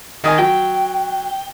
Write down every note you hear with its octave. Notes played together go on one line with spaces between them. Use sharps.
D#3 D#5 G#5
F#3 G5